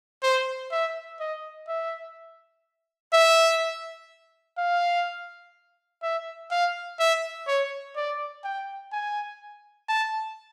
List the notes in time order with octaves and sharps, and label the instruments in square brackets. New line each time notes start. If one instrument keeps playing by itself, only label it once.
[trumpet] C5
E5
D#5
E5
E5
F5
E5
F5
E5
C#5
D5
G5
G#5
A5